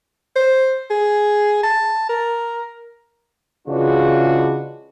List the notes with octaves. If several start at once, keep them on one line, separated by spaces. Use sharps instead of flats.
C5
G#4
A5
A#4
C#3 E3 G#3 D4 F4 F#4